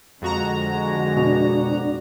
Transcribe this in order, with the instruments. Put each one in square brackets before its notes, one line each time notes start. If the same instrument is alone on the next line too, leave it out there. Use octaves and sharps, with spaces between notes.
[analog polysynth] F2 F#4 A#5 [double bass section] D3 G#3
[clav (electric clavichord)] B2 [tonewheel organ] D4